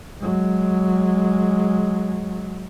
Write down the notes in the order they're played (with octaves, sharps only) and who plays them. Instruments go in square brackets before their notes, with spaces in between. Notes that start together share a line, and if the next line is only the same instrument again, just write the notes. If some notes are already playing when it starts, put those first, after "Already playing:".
[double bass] F#3 G#3